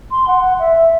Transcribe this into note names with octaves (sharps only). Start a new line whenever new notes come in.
C6
F#5
E5